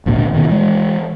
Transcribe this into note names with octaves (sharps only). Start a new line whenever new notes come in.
G#1 D2 A#2 D3
B2 D#3
E3 G#3